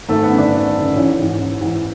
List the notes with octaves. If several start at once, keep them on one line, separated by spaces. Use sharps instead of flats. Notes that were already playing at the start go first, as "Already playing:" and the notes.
G#1 A3
B3
F#2 D3
D4
G#1
F#2 D3
A1 C#4
G#2 E3
A1
G#2 E3